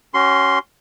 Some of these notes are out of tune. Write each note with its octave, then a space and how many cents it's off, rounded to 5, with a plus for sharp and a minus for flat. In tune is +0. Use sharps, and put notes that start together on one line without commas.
C#4 +0 F#4 +35 C6 +0